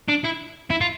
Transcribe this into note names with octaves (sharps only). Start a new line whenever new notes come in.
D4
E4
E4
F4